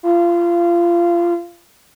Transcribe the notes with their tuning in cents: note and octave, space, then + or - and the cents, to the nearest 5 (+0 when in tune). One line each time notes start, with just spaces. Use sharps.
F4 -25